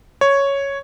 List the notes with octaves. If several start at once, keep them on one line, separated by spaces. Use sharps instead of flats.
C#5